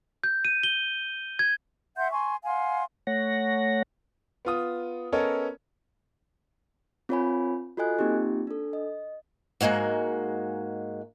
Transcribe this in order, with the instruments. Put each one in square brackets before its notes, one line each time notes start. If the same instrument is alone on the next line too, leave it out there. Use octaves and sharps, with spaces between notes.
[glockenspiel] G6
D#7
G7
G#6
[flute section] E5 F#5 C6 G6
G#5 C6 C#6
F5 F#5 G#5 C6
[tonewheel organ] A3 C#5 F#5 A#6
[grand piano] B3 F4 D#6
B3 C#4 A4 A#4 C#5 D#5
[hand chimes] C4 F4 A#4 C#5 G#5 B5
F4 F#4 A4 D#5 G#5 F#6
A#3 C4 D#4 F4 G4
D4 A4
D#5
[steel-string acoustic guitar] G#2 F3 G#3 A#3 F#4